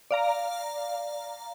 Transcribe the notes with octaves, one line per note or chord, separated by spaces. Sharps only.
D5 F5 A#5